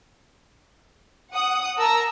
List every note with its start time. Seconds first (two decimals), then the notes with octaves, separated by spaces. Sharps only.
1.34 F#5 D#6
1.78 A#4 A5 A#5 E6 A#6